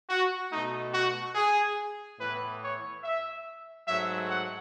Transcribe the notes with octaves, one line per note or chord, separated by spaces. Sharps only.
F#4
B2 A3 D#4
F#4
G#4
A2 E3 B3 B4
C#5
E5
G#2 F#3 A3 E5
F#5